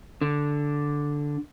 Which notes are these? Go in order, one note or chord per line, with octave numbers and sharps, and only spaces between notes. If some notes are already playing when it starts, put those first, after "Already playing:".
D3